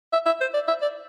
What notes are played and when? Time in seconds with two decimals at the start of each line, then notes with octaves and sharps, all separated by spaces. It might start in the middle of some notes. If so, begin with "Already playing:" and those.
0.13 E5
0.26 E5
0.41 C5
0.54 D5
0.68 E5
0.82 D5